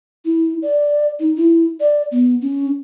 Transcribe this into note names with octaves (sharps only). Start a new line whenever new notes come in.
E4
D5
D#4
E4
D5
B3
C#4